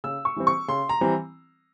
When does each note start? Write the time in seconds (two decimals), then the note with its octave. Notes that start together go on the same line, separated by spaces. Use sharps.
0.04 C#3 E6
0.25 C#6
0.36 E3 G3 C4
0.47 C#6
0.68 C#3 C6
0.89 A#5
1.01 E3 G3 C4